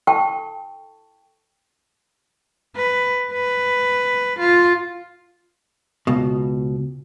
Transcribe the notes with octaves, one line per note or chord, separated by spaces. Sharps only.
A4 G5 A5 C#6
B4
B4
F4
C#2 B2